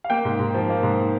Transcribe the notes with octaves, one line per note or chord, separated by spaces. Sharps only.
F5
A#3 G5
G#2
G#2
F3
A#3
G#2